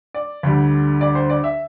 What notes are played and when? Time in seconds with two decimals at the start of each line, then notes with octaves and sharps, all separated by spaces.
0.14 D5
0.43 D2 D3 G3
1.01 D5
1.15 C5
1.30 D5
1.44 E5